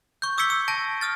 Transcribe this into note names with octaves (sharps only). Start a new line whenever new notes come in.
C#6 G6
D6 E6 G#6 B6 C#7 G7
E6
A5 G6 A#6 D7
D#6 F6 A6